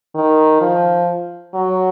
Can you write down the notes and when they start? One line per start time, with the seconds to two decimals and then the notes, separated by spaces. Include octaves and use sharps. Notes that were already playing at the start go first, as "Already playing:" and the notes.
0.15 D#3
0.61 F3
1.54 F#3